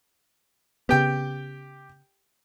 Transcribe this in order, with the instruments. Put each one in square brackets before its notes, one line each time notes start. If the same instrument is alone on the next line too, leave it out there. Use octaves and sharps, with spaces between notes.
[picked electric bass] C#3 B3 [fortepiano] G4 G5